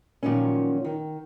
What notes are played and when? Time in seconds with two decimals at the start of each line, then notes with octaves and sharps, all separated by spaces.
0.23 A#2 D#3 F3 F#3 C#4
0.85 D#3